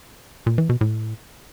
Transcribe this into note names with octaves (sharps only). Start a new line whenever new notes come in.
A#2
E3
B2
A2